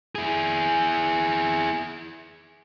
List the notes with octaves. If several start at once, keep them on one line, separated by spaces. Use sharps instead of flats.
E4 G#4